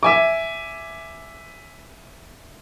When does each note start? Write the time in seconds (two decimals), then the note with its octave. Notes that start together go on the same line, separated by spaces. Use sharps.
0.03 E5 G#5 D6